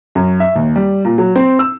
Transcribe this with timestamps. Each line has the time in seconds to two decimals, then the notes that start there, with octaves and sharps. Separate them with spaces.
0.15 F#2
0.40 E5
0.56 D#2
0.76 G3
1.05 A#2
1.18 F#3
1.36 C4
1.59 E6